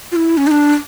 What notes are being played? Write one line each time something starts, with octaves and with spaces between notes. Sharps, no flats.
F4
E4
C#4
D#4
D4